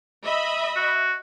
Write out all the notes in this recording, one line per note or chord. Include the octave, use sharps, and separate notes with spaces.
D#5 E5 B5
F#4